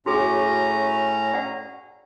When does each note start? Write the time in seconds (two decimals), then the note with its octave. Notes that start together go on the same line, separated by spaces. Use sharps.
0.06 A2 C#4 F#4 G#4 A#5
1.34 D5 F#5